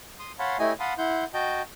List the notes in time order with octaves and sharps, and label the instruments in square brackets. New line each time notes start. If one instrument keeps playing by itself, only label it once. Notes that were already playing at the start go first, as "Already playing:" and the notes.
[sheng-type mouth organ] C6 D#6
C#5 F5 F#5 A5 B5 C6
A3 E4 G4 C#5 D#5 G#5
F5 F#5 A5 B5 C6 D#6
E4 F#5 C6 G6
F#4 D#5 G5 A5 G6